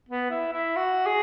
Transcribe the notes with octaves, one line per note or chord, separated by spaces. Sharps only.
B3
E4
E4
F#4
G#4